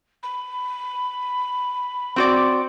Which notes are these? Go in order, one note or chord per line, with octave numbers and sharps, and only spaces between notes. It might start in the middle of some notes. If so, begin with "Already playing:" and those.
B5
C4 F#4 D5